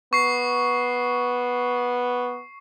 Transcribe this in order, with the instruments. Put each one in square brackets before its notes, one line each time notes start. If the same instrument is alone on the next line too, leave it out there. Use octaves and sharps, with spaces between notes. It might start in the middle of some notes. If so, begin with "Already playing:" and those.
[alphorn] B3 [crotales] C#6 C7